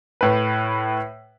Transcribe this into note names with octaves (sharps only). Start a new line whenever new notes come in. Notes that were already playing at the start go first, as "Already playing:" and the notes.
A2 B4